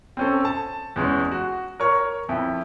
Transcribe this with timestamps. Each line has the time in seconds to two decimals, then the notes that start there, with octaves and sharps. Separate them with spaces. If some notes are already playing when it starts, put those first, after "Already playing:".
0.17 C4 C#4 A4
0.45 A5
0.96 E2 G#3 C#4
1.32 F#4
1.80 A#4 C#5 C#6
2.29 F2 E4